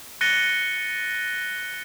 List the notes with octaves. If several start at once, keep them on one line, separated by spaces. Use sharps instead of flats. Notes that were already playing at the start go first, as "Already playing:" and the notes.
F#6 A6 A#6 C#7 D#7 G7